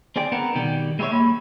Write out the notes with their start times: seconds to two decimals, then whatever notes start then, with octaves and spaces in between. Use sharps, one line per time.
0.16 C4 G#4 D5 G5
0.32 B3 C4 A#4 F#5
0.55 B2 D#3 G3 G4
0.99 G#3 E4 G4 A#4 C#5 E5
1.11 A#3 B5